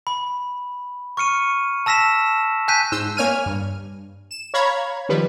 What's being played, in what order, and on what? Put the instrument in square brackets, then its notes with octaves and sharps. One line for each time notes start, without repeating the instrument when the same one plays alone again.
[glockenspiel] B5
C#6 F6 C#7 D#7
A5 E6 A#6 B6 E7
G#5 A5 F#6 G6 B6 D#7
[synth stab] G#2 C5 E6
A#3 C#5 G#5 F6 D#7
G2
E7
C#5 F5 A#5 B5 G#6
D#3 F3 G3 B4